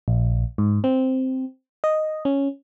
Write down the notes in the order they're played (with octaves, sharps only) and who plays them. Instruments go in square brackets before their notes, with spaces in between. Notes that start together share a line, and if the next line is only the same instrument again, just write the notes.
[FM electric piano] A#1
G#2
C4
D#5
C#4